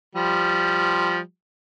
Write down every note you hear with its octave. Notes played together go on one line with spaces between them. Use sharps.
F3 G3